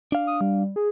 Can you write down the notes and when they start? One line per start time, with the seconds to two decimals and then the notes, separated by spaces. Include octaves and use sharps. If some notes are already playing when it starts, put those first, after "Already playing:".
0.12 D4 F5
0.27 D#6
0.41 G3
0.76 G#4